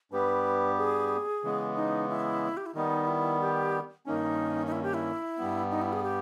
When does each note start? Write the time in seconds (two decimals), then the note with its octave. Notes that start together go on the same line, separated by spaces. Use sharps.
0.12 G2 G3 B3 G4 B4
0.78 G#4
1.44 C#3 E3 G#3 B3
1.76 D#4
2.09 E4
2.57 G4
2.66 E4
2.74 D#3 G3 B3 D#4
3.07 E4
3.41 G4
4.06 G2 D#3 A#3 C#4 D#4
4.66 D#4
4.72 E4
4.83 G4
4.94 E4
5.37 G2 G3 B3
5.71 D#4
5.82 E4
5.93 G#4
6.03 G4